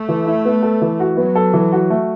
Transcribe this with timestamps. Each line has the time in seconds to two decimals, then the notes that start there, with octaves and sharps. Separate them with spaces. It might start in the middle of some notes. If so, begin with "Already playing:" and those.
Already playing: A3
0.09 E3
0.26 E4
0.45 B3
0.63 A4
0.82 E3
1.00 F#4
1.17 F#3 B3
1.35 A4
1.54 E3
1.72 F#4
1.90 A3